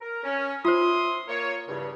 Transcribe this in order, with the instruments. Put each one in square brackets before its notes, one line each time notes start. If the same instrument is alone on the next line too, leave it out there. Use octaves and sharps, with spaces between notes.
[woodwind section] A#4
C#4
[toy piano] F4 C5 [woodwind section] E5 C6 D#6
[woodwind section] A#3 C#5
E2 G2 C#3